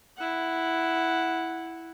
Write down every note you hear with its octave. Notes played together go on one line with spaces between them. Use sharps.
E4 F#5